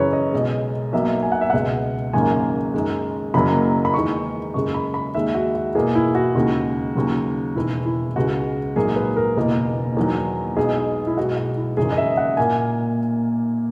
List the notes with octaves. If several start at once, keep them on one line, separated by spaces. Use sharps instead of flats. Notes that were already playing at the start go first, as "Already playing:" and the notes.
Already playing: F#2 C#3 E3 B4 C#5
D#5
B1 B2 G#3
B1 B2 F#3 A#3 E5
G#5
F#5
E5
C#2 B2 G#3 F#5
G#1 F#2 C#3 F#3 A#3 G#5
F#2 D#3 G#3
F#1 F#2 C#3 F#3 A#3 B5
B5
E2 D#3 G#3 C#6
F#2 C#3 G#3 C#6
B5
B5
D#2 D#3 G#3 E5
F#4
F#4
E2 B2 A#3 G#4
E4
F#4
D#2 C#3 G#3
D#2 C#3 F#3
E1 E2 D#3 E4
E4
C#2 C#3 G#3 F#4
A#1 G#2 F#3 A#3 G#4
B4
A#4
F#1 E2 B2 A#3
E2 D#3 F#3
B1 B2 G#3 G#4
E4
B1 B2 G#3 F#4
F#4
E4
G#1 F#2 C#3 E3 G#4
D#5
E5
F#5
A#2 A#3 G#5